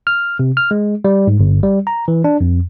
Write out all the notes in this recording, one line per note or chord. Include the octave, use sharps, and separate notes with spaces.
F6
C3
F6
G#3
G3
G#2
G1
G3
A#5
E3
D4
F2